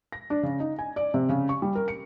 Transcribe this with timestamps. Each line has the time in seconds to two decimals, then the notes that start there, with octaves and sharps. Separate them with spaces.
0.12 A#6
0.30 D4
0.43 C#3
0.60 D#4
0.79 G#5
0.96 D5
1.14 C3
1.29 C#3
1.49 C#6
1.62 G3
1.75 A#4
1.88 C#7